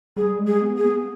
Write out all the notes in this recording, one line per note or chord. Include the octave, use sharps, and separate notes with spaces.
G3 G#4
G#3
G#4
B3
A#3 G#4
B3